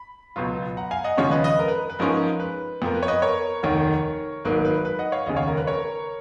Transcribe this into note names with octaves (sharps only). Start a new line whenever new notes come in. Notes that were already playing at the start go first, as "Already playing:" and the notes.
Already playing: B5
C#2 B2 F#3 B3 F4
F#5 A#5
F5 G#5
D#5 F#5
D#2 C#3 F3 G#3 C#4 C#5 F5
B4 D#5
B4 D#5
A#4
B4
B4
G#2 F3 G#3 C#4 A#4
B4
F2 F3 B3 A#4
B4
C#5
B4 D#5
A#4 C#5
F1 D#2 D#3 A#4 C#5
G#1 G#2 F#3 A#3 B4
B4
B4
D#5 F#5
C#5 F5
F1 D#2 C#3 D#5 F#5
C#5 F5
A#4
B4
A#4 C#5